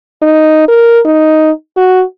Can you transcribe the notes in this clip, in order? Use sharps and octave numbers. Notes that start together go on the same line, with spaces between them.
D#4
A#4
D#4
F#4